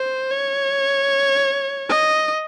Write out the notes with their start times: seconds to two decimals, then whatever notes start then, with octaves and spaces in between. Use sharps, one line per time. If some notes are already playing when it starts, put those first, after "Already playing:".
Already playing: C5
0.31 C#5
1.89 D#5